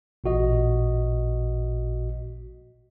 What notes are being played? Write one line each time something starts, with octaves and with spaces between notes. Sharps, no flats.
A1 A#2 F#4 D#5